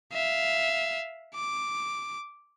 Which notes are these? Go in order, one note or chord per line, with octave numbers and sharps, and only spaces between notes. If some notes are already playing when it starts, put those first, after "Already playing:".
E5 F5
D6